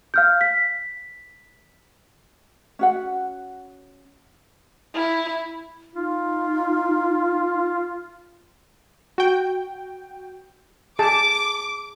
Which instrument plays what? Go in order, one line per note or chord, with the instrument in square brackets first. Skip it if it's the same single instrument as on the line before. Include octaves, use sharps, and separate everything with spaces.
[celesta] F5 F6 G6
B6
[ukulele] C#4 F#4 F#5
[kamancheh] E4
[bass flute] D#4 [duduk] F4
[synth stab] F#4 G5
[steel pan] G#4 A5 [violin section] D6